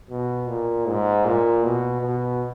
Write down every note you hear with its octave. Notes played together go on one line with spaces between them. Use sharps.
B2
A#2
G#2
A#2
B2
B2